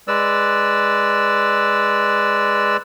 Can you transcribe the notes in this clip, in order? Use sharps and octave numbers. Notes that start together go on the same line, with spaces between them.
G#3 B4 D5 E6